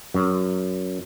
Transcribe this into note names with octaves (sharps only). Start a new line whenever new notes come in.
F#2